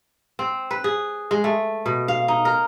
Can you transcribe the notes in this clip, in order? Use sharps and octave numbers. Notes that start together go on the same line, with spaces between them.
C4
B4
G#4
G#3
A3
B2
F5
D#4
A#4